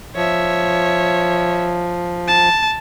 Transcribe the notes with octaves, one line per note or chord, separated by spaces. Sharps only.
F3 C#5 E5
A5